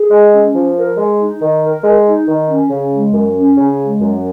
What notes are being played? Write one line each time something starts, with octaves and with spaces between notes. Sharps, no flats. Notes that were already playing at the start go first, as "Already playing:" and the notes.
Already playing: G#4
G#3
C#4
F3
A#4
G#3
D#4
D#3
A#4
G#3
D#4
D#3
C#4
C#3
G#3
F#2
C#4
C#3
G#3
F#2